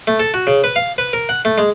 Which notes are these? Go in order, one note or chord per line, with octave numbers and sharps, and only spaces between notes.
A3
A4
F#4
C#3
B4
F5
B4
A#4
F#5
A3
G#3